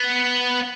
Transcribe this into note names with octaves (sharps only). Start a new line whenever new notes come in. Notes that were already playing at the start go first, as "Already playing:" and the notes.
Already playing: B3